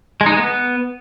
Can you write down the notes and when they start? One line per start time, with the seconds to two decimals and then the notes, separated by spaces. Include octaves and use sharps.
0.21 G#3
0.26 D#4
0.32 G#3
0.37 B3